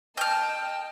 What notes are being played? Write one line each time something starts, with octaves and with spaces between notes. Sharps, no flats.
D#5 G5 A5 F6 G6